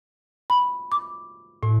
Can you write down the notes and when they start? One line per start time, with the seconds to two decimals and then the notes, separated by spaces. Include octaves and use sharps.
0.50 B5
0.92 D6
1.63 A2